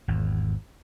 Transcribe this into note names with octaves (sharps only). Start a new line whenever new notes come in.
G#1 E2